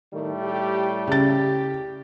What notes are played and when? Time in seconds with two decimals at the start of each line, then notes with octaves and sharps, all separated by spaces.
0.13 A2 D#3 G3 A3
0.44 G4
1.07 C#3 G4 A6